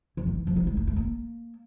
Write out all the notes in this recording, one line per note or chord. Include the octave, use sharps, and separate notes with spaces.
E3
D#3
E3
F3
G3
G#3
A3
A3
A#3